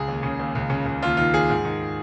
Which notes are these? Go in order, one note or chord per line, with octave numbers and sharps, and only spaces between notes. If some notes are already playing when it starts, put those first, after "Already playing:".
Already playing: C#2 G#4
D#2
C#3
D#2
C#2
C#3
C#2
D#2 F4
D#3 F4
D#2 G#4
G#2
D#3